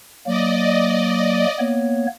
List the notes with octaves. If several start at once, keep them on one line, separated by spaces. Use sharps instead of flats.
F#3 A#3 D5 D#5
A#3 B3 C#5